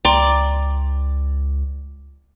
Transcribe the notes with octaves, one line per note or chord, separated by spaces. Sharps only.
C#2 D5 G5 A#5 C6